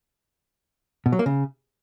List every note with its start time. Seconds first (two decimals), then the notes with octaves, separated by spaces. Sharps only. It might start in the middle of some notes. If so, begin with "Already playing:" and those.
1.06 B2
1.12 F#3
1.19 A#3
1.26 C#3